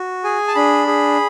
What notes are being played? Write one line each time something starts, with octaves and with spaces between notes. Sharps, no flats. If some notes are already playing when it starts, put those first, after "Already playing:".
Already playing: F#4
G#4 G#5
A5
D4 B5
G#4